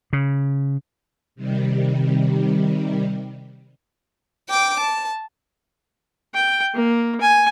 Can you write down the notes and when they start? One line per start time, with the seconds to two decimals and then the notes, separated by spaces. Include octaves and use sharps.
0.13 C#3
1.36 C3 D#3 G3
4.49 G5 D6
4.80 A5
6.34 G5
6.74 A#3
7.21 G#5